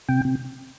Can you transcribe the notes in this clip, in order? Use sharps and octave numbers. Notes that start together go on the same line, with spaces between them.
C3 G5
C3